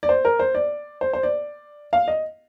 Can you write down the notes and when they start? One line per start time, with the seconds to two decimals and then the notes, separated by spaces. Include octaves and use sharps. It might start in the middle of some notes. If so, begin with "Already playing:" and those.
0.03 D5
0.09 C5
0.25 A#4
0.39 C5
0.55 D5
1.01 C5
1.13 C5
1.23 D5
1.93 F5
2.08 D#5